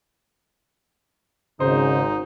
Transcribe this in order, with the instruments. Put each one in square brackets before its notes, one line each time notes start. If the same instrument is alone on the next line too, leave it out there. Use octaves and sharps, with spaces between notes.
[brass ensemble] G#1 G#2 [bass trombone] C#3 [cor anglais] D#4 [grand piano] C5